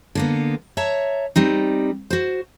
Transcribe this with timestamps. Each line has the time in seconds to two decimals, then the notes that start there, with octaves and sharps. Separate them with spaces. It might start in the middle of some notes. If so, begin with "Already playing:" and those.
0.15 D3 A#3 B3
0.77 C#5 E5 A5 A#5
1.36 G3 C4 D#4
2.10 F#4 C5